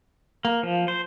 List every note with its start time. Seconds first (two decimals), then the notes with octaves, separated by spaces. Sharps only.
0.45 A#3
0.63 F3
0.88 C5